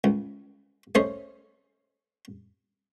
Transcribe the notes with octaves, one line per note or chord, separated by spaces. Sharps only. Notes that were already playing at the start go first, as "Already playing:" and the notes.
C#2
A3 C#4 C5 D#5